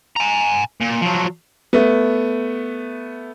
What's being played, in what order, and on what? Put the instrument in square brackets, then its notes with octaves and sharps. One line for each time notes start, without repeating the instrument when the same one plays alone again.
[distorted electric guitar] G#5 A#5
A#2
F3 F#3
[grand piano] A3 B3